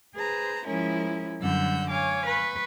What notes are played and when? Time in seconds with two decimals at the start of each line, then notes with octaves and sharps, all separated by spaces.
0.16 G#4 B4 C5 A#5
0.65 F3 G#3 C#4 E4 A#4
1.40 F#2 D3 G3 F#5 E6 G6
1.89 C#5 F5 G#5 D6
2.26 B4 C#6